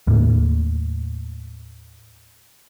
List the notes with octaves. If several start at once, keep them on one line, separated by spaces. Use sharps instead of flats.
D#2 A2 A#3